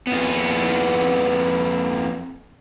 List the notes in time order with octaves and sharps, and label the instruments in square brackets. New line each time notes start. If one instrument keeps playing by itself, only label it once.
[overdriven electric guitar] F2 B3